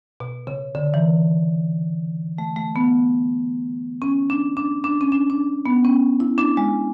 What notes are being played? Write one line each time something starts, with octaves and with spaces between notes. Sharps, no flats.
B2
C#3
D3
E3
A3
A3
B3
C#4
D4
D4
D4
C#4
D4
D4
B3
C#4
E4
D4
G#3